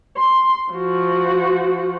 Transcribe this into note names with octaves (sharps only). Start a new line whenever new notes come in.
C6
F3 F#4